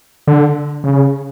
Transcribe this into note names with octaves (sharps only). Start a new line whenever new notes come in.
D3
C#3